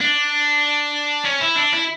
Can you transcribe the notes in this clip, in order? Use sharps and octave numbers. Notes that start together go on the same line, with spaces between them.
D4
C#4
E4
D4
E4